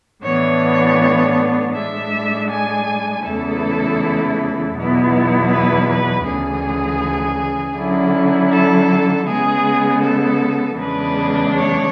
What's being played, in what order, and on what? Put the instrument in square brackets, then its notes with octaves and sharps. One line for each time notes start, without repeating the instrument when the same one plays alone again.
[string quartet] A2 E3 B3 D4 C#5
A2 G#3 D4 E5
G#5
E2 C#3 E3 A3 E4 A4
E2 B2 F#3 B3 E4
B4
B4
D2 C#3 E3 G#4
D3 F#3 C#4 E4
A4
C#3 G#3 B3 G#4
A4
E2 C#3 E3 G#3 D4 B4
C#5